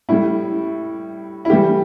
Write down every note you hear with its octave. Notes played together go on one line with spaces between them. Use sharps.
A2 G3 E4
E4
A2 E3 G3 G4